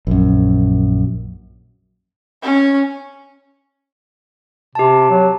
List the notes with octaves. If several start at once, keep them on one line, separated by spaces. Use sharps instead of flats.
A#1 F#2
C#4
C3 G4 A5
F#3